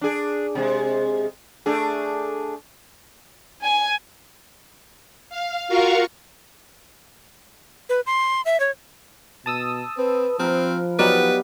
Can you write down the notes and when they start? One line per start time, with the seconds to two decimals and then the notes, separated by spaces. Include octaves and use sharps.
0.01 D4 G#4
0.55 C3 G#3
1.66 A3 D4 G#4
3.63 G#5
5.30 F5
5.68 F4 F#4 A#4 F5 C#6
7.89 B4
8.06 C6
8.45 E5
8.60 C#5
9.46 B2 A5 D#6 E6
9.98 C4 B4
10.39 F3 C4 A#4 B4
10.99 F#3 B3 D#4 G4 B4 D5 F5